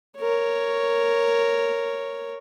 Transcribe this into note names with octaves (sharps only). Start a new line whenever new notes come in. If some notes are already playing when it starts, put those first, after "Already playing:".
A#4 C#5